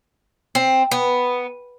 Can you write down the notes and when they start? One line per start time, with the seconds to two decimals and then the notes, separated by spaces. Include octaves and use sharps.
0.55 C4
0.92 B3